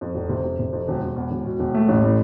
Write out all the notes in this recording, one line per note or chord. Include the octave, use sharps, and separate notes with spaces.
F2
F1
C3
F1
C3
F2
E1
E1
E2
E1
B2
E1
A3
A1
A2